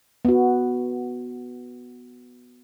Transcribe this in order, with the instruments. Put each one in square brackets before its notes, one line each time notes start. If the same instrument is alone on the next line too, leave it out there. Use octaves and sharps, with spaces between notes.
[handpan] B3 F#4